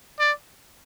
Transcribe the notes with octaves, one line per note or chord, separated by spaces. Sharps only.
D5